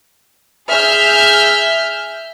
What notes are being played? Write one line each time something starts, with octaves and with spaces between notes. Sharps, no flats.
G#4 E5 F6 G6